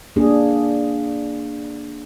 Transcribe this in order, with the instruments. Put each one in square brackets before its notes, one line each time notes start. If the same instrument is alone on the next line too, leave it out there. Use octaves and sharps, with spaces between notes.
[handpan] A#3 D4 G#4